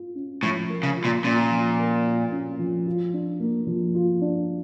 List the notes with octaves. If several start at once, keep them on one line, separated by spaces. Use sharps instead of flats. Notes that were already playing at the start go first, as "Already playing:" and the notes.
Already playing: F4
C#4
A2 F3
A#4
C#3
F4
A#2
A#2 C#4
F3
A#4
F4
C#4
F3
F4
D4
A#3
F3
F4
D4